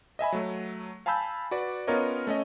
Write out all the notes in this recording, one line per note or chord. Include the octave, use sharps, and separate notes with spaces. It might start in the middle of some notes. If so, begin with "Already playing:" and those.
D#5 E5 G#5 B5
F#3 A3
F5 G#5 A5 B5 E6 G6
F#4 B4 D5
B3 C#4 F4 A#4 C#5 D#5
A3 C#4 D#5